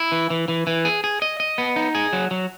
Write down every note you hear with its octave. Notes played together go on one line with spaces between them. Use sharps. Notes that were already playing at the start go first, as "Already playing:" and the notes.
Already playing: E4
E3
E3
E3
E3
G#4
G#4
D#5
D#5
B3
D#4
G#4
F#3
F#3